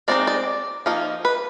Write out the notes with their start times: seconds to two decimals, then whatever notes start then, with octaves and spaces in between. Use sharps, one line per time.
0.08 G#3 C4 D#4 D5
0.27 D5
0.86 F3 A#3 D#4
1.25 B4